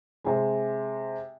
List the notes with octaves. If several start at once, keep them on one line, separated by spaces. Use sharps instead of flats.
C3 G#3